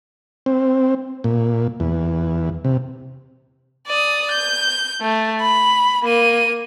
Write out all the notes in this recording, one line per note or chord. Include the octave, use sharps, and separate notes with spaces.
C4
A#2
E2
C3
D5 D#6
G6
A3
B5
A#3 D#7